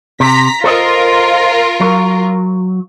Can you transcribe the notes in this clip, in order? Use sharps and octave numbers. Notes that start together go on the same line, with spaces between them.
C3 A#5 B6
F4 A4 A#4 C5 D#5
F#3